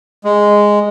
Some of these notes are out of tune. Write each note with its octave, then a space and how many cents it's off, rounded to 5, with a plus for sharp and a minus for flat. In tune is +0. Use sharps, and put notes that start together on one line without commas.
G#3 -5